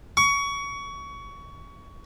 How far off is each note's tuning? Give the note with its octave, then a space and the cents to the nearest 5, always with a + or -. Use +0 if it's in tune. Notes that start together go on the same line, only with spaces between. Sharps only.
C#6 +20